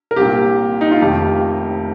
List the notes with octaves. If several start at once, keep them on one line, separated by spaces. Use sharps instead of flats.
A#4
C2 A#2 G4
D#4
F4
F1 F2 D#3 G4